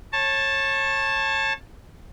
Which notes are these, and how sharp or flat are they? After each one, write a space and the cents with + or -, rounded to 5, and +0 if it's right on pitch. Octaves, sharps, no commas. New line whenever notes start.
C#5 -25 A5 +0